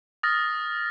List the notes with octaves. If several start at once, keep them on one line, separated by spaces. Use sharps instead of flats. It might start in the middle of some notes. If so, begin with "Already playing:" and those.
D#6 F6 A6 A#6